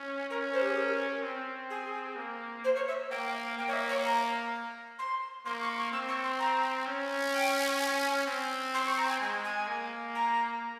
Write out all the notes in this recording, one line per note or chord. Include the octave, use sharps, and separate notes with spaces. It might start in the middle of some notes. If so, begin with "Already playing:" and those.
Already playing: C#4
C#4 A#4
C5
G4
G#4
A#4
C4
G#4
A#3
C5
C#5
E5
A#3 G5
A#3 G5
C#5
E5
C#5
A#5
C6
A#3 C6
C#6
C#6
C4 E6
C#6
C6
A#5
C#4
G5
G#5
C4
C6
C#6
A#5
G#5
G#3 G#5
G#5
A#3
A#5